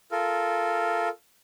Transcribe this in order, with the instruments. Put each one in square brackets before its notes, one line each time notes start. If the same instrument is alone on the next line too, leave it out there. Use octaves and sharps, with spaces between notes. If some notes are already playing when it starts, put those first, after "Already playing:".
[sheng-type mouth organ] F4 A4 A#4